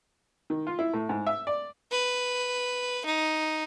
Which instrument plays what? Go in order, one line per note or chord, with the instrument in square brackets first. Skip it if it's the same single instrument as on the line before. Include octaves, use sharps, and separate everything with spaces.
[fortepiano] D#3
F4
E4
A2
G#2
E5
D5
[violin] B4
D#4